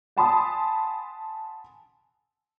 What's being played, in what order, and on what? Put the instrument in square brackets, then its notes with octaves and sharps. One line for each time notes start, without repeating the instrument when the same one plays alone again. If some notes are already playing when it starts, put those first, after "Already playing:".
[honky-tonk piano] F#5 G#5 A5 B5 C6 D#6